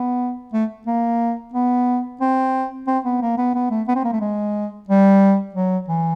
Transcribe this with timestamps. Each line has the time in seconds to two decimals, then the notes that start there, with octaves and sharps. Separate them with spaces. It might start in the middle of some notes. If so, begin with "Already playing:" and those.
Already playing: B3
0.53 A3
0.87 A#3
1.54 B3
2.21 C4
2.87 C4
3.05 B3
3.22 A#3
3.38 B3
3.55 B3
3.71 A3
3.88 B3
3.96 C4
4.05 A#3
4.13 A3
4.21 G#3
4.89 G3
5.55 F#3
5.89 E3